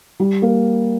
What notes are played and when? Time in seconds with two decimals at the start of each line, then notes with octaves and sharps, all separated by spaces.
0.20 G3
0.42 A#3